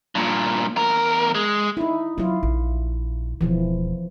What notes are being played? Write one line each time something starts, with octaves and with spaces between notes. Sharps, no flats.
G2 A#2
E2 A#4
G#3
D#4 E4
F#3 C#4 E4 F4
A#1
E1 E3 F3